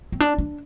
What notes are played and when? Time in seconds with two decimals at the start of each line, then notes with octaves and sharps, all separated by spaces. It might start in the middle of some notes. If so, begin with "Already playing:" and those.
0.12 C4
0.20 D4
0.38 D4